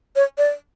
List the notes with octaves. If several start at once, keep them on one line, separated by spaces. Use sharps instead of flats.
C#5
D5